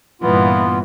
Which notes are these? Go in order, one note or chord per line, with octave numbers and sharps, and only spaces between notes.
G2 A#2 E3 B3 F4